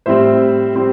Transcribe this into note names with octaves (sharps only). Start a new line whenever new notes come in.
A2 G3 C4 C5 E5
G3 C4